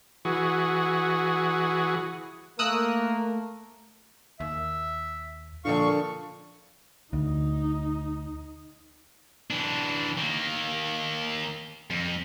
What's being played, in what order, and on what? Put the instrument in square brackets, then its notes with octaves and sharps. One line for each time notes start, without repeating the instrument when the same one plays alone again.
[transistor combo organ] E3 F#4 G#4
[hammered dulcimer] A3 [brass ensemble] A#3 [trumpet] A#4 [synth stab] D#6 E6 F#6
[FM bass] D#2 [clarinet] E5
[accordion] A#2 C#6 [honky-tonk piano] D3 F3 A4 [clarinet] F5
[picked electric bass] D2 [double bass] D#4
[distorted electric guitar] E3 D4
D#3 A#3
F2